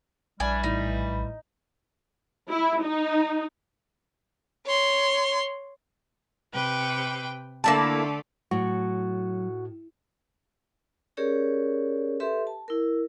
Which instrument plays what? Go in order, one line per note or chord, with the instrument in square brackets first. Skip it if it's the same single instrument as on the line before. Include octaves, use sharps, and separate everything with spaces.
[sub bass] A#1 [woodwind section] E3 G3 [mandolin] D4 G#5
[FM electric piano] A1 A2 E4 [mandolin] D#4
[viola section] E4
D#4
[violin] C#5 C6
[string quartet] C3 B4 G5
[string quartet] D3 A3 [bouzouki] A#3 E4 A5
[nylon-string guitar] A2 [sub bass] F#3 [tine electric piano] F#4
[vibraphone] C#4 G4 G#4 A#4 C#5 D5
G4 A4 B4 E5 C6
A5
E4 A#4